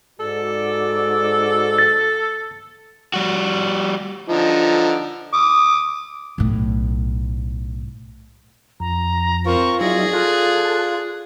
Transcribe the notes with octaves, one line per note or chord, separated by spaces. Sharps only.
G#2 F#4 A4 D5
A6
G3 F#4
D3 F3 D#4
D6 D#6
B1 A2
F2 A#5
C4 F4 A#4 C#6
F#3 D#4 E4 G#4 D5 A#6
F4 A4 F#6